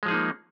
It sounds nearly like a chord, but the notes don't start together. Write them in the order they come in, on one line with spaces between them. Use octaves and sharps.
G#3 F3 G#4 D#4 A#3